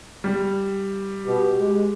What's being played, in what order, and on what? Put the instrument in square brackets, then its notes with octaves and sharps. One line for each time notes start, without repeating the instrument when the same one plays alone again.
[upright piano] G3
[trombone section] B2 [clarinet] G4
[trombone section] G#3